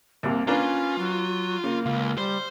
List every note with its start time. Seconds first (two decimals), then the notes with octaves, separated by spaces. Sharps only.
0.23 C2 C3 A#3
0.47 A#3 C#4 D4 F4 B4
0.98 F#3
1.64 C#3 A#3
1.86 C#2 F4
2.18 G3 C5